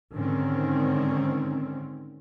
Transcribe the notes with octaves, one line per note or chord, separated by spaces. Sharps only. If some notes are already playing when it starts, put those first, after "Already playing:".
G#2 D3 D#3 C4 C#4